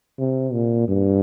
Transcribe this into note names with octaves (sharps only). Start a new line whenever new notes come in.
C3
A#2
G2